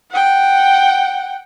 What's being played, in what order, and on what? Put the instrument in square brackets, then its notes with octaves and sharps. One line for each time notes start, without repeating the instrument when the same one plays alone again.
[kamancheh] F#5 G5